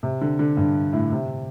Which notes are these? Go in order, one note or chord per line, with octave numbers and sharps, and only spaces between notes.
C3
D3
D3
G2
A2
C3